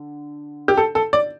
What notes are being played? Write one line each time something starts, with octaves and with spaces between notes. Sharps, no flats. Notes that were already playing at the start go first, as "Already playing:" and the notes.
Already playing: D3
G4
A4
A4
D5